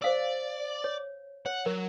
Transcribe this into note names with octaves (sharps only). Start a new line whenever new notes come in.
C5 D5 F5 E6
C#5
C#5 F#5
F#3 A#4